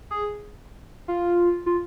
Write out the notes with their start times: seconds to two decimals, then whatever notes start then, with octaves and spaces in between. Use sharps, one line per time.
0.11 G#4
1.08 F4
1.66 F4